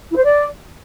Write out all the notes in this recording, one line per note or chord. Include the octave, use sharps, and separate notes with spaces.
E4
C5
D5